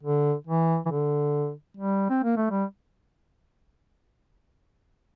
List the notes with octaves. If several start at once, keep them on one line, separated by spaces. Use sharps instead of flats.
D3
E3
E3
D3
G3
C4
A#3
A3
G3